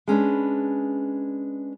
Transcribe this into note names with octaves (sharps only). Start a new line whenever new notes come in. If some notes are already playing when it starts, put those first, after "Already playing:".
G#3 C#4 D4 B4